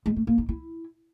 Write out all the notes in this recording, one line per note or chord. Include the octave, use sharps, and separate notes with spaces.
G#3
A3
A#3
D#4
E4